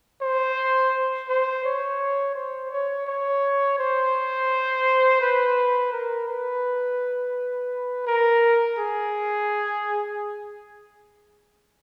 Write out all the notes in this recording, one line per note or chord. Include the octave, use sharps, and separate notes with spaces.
C5
C5
C#5
C5
C#5
C#5
C5
B4
A#4
B4
A#4
G#4